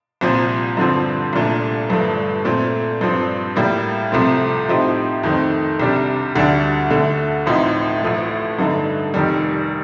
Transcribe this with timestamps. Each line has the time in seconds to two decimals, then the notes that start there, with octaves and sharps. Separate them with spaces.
0.21 C2 A#2 F3 C4
0.77 G2 D3 F3 C4
1.33 C2 A#2 A3 D4
1.89 G1 G2 F3 A3
2.45 A#2 A3 C4
3.01 G2 F3 C4
3.56 A2 G3 A#3
4.12 C2 C3 F3 A3 C4
4.68 A2 F3 C4 D#4 G4
5.23 F2 D#3 A3 C4
5.80 C2 C3 G3 D4 G4
6.35 D2 D3 G3 D4
6.90 D2 D3 A3
7.46 A1 A2 F3 C4 D#4
8.03 A1 A2 F3 A3
8.59 G2 D3 A3 D#4
9.14 F1 F2 D#3 G3